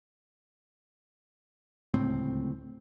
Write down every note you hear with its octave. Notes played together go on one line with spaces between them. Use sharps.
D1 C#2 A2 C4